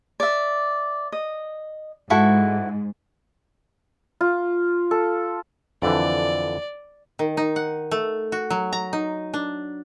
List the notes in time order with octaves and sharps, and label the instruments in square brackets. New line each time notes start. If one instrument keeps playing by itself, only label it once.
[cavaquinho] D5 E5
D#5
[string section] G#2 [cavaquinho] E4 F#4 A4
[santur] F4
A4
[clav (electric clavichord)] F2 D3 E3 [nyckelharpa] D5
[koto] D#3
D#4
F#5
A3
F#4
F#3
A#5
D#4
D4